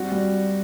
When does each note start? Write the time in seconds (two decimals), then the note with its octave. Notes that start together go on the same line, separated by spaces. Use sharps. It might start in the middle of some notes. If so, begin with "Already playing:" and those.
Already playing: G3 C4 F#4
0.12 G3